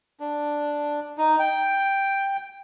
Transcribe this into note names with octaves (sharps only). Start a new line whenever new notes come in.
D4
D#4
G5